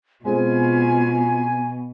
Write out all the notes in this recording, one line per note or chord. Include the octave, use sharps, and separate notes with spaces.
B2 G#3 C4 F4 G#4 G#5